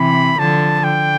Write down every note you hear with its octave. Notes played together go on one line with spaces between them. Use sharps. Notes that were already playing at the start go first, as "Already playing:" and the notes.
Already playing: C3 E3 B5
D3 F3 A5
D3 G5